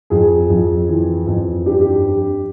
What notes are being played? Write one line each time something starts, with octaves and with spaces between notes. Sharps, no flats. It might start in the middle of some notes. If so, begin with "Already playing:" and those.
F2 G#4
F2
E3
F2
G2 G4
G4